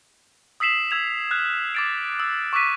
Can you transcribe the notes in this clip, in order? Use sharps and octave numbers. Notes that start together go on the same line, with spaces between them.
D#6 E6 B6 C7 E7 F#7
E6 G#6 F7
F6 F#6 G#6
D6 A6 D7
E6
C#6 D6 E6 F#6 B6 D#7